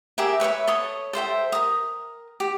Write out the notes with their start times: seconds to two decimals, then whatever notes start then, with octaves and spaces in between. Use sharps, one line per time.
0.18 G4 G#4 A#4 E5
0.40 B4 C#5 D#5 E5
0.67 A4 C#5 D#6
1.13 A4 C5 E5 G5
1.52 A#4 D#6
2.40 G4